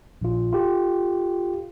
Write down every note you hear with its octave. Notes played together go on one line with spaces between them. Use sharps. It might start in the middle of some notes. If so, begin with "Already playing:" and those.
A#1 F4
F4 G4 A4